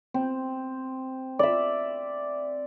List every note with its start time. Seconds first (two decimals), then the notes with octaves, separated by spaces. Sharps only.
0.14 C4
1.39 D5 E5